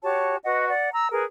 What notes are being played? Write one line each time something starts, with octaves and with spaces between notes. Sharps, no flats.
F#4 G4 C#5 A5
F#4 B4 D#5 F#5
D5 F#5
A#5 E6
G#4 A#4 B4